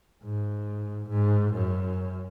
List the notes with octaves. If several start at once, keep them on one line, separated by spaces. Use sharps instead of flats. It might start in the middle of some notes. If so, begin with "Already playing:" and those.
G#2
G#2
F#2